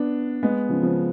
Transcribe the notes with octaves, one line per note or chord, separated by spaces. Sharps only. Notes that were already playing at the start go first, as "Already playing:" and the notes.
Already playing: B3 D4
G#3 B3
C#3 F3
C#3 F3